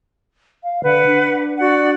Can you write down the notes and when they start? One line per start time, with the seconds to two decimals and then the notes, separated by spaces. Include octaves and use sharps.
0.64 F5
0.84 D3 B4 F#5
1.06 D4
1.58 F#4 D5 F#5